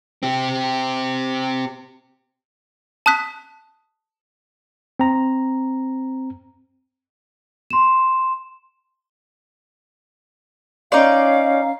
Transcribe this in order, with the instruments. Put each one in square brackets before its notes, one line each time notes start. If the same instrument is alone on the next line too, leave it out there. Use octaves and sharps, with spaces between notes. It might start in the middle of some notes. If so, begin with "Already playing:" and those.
[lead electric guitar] C4 G4
[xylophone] A5 D#6 F#6 B6
[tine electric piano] C4 A#5
[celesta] C6 E7
[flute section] C#4 F5 [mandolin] D#4 D5